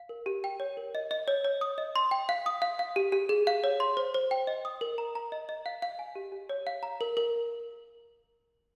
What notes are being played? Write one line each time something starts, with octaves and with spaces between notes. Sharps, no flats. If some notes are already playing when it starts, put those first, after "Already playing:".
Already playing: F5
A#4
G4
G5
C#5
A#4
D#5
D#5
C#5
C#5
D#6
D#5
C6
G5
F5
D#6
F5
F5
G4
G4
G#4
F5
C#5
C6
C5
C5
G5
D#5
D#6
A#4
A#5
A#5
D#5
D#5
F5
F5
G#5
G4
G4
C#5
F5
A#5
A#4
A#4